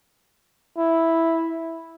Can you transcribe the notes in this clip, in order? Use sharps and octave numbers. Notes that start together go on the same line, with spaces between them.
E4